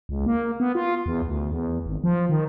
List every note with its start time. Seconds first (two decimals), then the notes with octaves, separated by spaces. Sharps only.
0.09 C#2
0.26 A#3
0.60 B3
0.75 F4
1.06 E2
1.27 D2
1.51 E2
1.86 G#1
2.04 F3
2.29 D#3